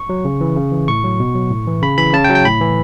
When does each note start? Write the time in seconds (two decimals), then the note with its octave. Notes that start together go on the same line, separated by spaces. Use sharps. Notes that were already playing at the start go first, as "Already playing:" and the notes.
Already playing: C#6
0.09 F#3
0.25 C#3
0.41 E3
0.57 C#3
0.72 E3
0.88 A2 C#6
1.04 F#3
1.20 B2
1.35 F#3
1.51 A2
1.67 E3
1.82 C#3 B5
1.98 E3 B5
2.13 C#3 A5
2.24 G5
2.29 F#3
2.35 G5
2.45 A2 B5
2.61 E3